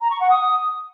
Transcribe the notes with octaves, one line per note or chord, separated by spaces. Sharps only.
A#5
C#6
F#5
D#6